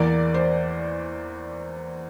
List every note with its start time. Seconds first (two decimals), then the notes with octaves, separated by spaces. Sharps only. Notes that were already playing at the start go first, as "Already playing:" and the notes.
Already playing: E2 E3 A#3 D5
0.34 C5